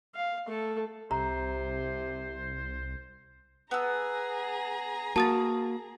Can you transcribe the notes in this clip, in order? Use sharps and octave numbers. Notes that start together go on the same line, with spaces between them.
F5
A3 A4
C2 C3 C5 A#5
B3 G#4 A#5 E6
A#3 F#4 A5 D#6 A6